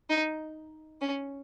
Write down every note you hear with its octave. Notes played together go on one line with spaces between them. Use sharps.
D#4
C#4